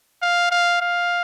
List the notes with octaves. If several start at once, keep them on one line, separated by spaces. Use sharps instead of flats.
F5
F5
F5